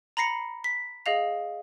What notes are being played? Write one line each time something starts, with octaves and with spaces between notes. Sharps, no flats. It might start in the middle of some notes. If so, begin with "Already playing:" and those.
A#5 B5 A#6 C7 C#7
B6
G#4 D#5 F5 F7